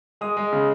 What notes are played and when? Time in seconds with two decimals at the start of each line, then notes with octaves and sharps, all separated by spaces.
0.21 G#3 D#6
0.37 G#3
0.53 C#3